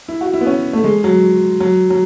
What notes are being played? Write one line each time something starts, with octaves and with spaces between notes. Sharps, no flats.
E4
F#4
E4
B3
C#4
A3
G#3
F#3
F#3
F#3